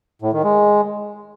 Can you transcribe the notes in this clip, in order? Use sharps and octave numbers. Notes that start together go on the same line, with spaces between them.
A2
D#3
G#3